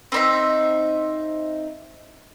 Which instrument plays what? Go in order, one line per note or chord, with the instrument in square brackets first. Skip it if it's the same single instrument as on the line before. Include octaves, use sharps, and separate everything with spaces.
[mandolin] C4 D#4 E5